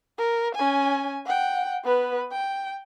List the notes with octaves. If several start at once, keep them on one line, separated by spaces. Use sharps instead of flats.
A#4
C#4 G#5
F#5 G5
B3 B4
G5